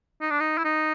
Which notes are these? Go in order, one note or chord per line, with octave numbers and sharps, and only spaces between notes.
D#4
D4
D#4
E4
D#4